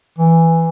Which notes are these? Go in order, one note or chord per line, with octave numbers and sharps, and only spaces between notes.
E3